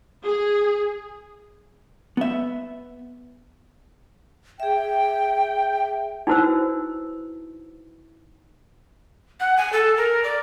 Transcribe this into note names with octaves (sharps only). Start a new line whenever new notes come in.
G#4
B3 E5
G#4 E5 G5
D#4 E4 F#4 B4 C5 E6
F#5
G#5
A4
A#4
D5